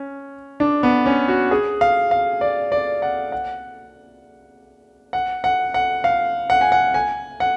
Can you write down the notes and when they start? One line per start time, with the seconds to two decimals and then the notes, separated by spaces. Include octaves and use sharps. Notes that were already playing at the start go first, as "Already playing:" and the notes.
Already playing: C#4
0.60 D4
0.83 B3
1.06 C#4
1.28 F#4
1.51 G#4
1.81 F5
2.11 F5
2.41 D5
2.72 D5
3.02 F#5
3.32 F#5
5.13 F#5
5.44 F#5
5.74 F#5
6.04 F5
6.50 F#5
6.61 G#5
6.72 F#5
6.94 G#5
7.40 F#5